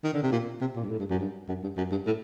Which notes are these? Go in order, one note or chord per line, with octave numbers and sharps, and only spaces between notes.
D#3
D3
C3
A#2
C3
A#2
G2
A2
G2
F#2
G2
F#2
G2
F#2
G2
A2